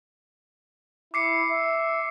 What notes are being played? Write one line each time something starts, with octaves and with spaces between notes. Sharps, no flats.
E4 D6 C7 C#7
E5